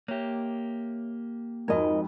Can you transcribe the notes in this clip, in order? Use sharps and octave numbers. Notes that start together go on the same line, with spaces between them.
A#3 G4 C#5 E5
F2 G#2 D#4 F#4 A#4 D#5